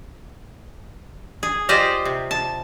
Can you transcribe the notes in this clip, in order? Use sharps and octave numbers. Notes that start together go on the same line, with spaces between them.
G#4
F4 G4 C5 D5 D#5
C3
A5